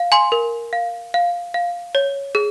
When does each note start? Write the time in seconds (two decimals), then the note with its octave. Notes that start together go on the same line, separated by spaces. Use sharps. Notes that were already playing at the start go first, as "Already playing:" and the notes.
Already playing: F5
0.12 G#5 C6
0.32 A#4
0.73 F5
1.14 F5
1.54 F5
1.95 C#5
2.35 G#4